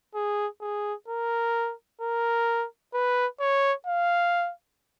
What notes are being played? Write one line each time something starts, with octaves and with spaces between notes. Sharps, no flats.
G#4
G#4
A#4
A#4
B4
C#5
F5